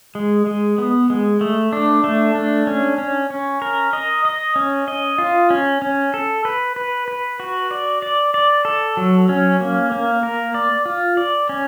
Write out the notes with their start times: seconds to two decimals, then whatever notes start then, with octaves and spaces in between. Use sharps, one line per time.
0.15 G#3
0.46 G#3
0.78 B3
1.10 G#3
1.41 A3
1.73 D4
2.04 A3
2.35 D4
2.67 C#4
2.98 C#4
3.30 C#4
3.62 A#4
3.93 D#5
4.25 D#5
4.56 C#4
4.88 D#5
5.18 F4
5.50 C#4
5.82 C#4
6.14 A4
6.45 B4
6.76 B4
7.08 B4
7.40 F#4
7.71 D5
8.02 D5
8.34 D5
8.65 A4
8.97 F#3
9.29 C#4
9.60 A#3
9.92 A#3
10.23 A#4
10.54 D5
10.86 F4
11.17 D5
11.49 C#4